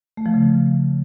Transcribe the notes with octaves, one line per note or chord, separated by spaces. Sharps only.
A3
F3
C#3
F3